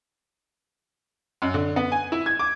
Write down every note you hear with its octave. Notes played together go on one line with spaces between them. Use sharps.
F#2
D3
B3
G#5
E4
G#6
D6